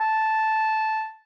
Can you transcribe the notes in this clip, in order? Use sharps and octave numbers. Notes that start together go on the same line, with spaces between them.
A5